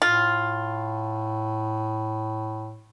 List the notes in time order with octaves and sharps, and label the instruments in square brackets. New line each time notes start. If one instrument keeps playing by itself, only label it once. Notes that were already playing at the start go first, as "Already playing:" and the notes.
[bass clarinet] A2 [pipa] F4